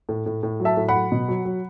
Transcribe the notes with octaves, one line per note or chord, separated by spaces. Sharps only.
A2
A2
A2
F#3
E5 A5
A2
F#5 B5
F#3
B2
F#3
F#3